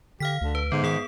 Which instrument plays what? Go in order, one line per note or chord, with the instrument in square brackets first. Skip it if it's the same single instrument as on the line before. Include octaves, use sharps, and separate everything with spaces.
[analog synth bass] D3 [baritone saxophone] G4 [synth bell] F5 F6 B6
[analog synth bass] D2 [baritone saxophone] D3
[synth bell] B4
[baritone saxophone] G#2 [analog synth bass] D3 [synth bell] B3
[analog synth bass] D#3 [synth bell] G#4 D#6